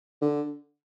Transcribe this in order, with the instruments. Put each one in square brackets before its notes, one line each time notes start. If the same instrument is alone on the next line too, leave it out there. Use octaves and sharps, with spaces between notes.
[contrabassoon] D3